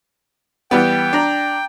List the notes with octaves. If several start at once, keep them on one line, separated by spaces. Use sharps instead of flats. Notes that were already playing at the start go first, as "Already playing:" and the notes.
E3 G3 B3 G5
D4 A#5